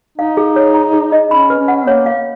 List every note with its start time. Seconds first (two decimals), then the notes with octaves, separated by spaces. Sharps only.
0.18 D#4 F5
0.37 G#4
0.56 C#5
0.74 A#5
0.93 G#4
1.12 D#5
1.31 C#4 B5
1.50 B4
1.59 C#4
1.68 F#5
1.87 A#3 C#5
2.06 F5